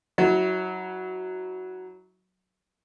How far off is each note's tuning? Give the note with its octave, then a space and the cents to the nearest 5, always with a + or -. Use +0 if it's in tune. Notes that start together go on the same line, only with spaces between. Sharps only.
F#3 +0 E4 -35